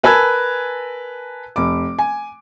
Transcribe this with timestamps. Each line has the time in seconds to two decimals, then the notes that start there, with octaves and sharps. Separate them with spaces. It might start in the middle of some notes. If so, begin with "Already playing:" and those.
0.03 A#4 B4 G#5 A5 E6 G#6
1.56 F1 D6
1.99 G#5